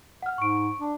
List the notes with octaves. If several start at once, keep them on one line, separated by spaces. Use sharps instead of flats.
F#5 F6
G#2 C#6 D7
D4